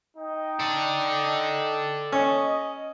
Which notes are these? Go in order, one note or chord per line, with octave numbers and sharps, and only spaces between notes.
D#4 D#5 G5
A4 D5
C#4 D#5